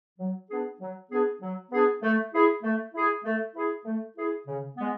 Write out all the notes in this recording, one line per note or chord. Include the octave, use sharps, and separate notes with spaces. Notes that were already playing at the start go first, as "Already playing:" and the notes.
F#3
B3 D4 G#4
F#3
B3 D4 G#4
F#3
B3 D4 G#4
A3
E4 G#4
A3
E4 G#4
A3
E4 G#4
A3
E4 G#4
C#3
G#3 B3